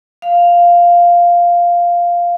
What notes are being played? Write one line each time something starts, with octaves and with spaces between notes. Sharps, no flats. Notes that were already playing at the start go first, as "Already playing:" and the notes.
F5